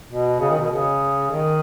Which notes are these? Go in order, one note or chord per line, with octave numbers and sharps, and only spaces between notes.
B2
C#3
D#3
B2
C#3
D#3